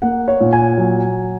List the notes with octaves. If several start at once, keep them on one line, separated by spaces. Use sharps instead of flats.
A#3 F#5
C#5
A#2
G#5
F#3